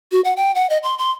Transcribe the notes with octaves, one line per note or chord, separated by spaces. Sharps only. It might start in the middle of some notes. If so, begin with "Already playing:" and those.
F#4
F#5
G5
F#5
D#5
C6
C6